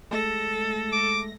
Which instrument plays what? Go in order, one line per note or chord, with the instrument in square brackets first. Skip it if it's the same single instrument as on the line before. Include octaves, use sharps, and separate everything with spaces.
[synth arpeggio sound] G#3 A3 A#6 [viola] A4
[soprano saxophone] D6